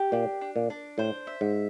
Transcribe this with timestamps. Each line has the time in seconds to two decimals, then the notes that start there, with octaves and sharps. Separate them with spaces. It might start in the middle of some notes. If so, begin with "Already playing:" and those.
Already playing: G4
0.12 A#2 D4
0.41 D4
0.56 A#2
0.70 D4
0.98 A2 C5
1.27 E5
1.41 G#2